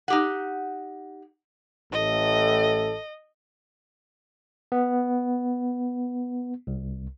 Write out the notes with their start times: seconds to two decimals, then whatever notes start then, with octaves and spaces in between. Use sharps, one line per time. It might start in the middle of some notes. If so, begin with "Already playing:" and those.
0.08 D#4 G4 F#5
1.92 A1 A2 A4 D#5
4.72 B3
6.67 C2